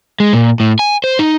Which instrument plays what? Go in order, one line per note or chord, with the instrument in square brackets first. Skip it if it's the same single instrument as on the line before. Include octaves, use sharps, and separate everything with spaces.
[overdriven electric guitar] G#3
A#2
A2
G#5
C5
D#4